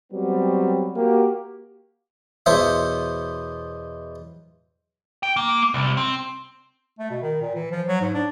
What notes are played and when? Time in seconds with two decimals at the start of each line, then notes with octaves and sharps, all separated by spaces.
0.12 F#3 G3 B3 C4
0.96 A#3 F#4 G4
2.46 E2 B2 C5 C#5 E5
5.23 G5
5.37 A#3
5.74 C2
5.97 C4
6.99 A3
7.10 B2
7.22 D#3
7.41 A#2
7.55 E3
7.71 F3
7.87 F#3
8.01 G#2
8.14 D4